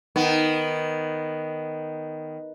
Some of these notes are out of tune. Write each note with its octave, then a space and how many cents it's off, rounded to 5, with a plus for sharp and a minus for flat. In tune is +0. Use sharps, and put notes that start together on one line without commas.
D#3 +0 B3 +0